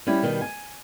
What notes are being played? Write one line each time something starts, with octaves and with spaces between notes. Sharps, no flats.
G3 C#4 E4 G4
B2 D#3 G3
G#5